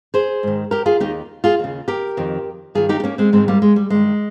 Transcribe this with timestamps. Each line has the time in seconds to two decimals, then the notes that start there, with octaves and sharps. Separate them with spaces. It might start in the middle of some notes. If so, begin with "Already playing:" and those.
0.14 G#4 C5
0.43 G#2 D#3
0.71 G4 A#4
0.86 F4 G#4
1.00 D#2 D#3 D#4 G4
1.44 F4 G#4
1.59 D#2 C#3
1.88 G4 A#4
2.17 F2 D#3
2.75 G2 D#3 F4 G#4
2.89 D#4 G4
3.00 D#4
3.04 A#3 C#4
3.18 G#3 C4
3.33 G#2 D#3 G#3 C4
3.48 G3 A#3
3.62 G#3
3.76 G3
3.90 G2 D#3 G#3